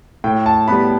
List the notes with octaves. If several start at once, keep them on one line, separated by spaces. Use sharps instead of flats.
A2 G5
A5
G3 B3 B5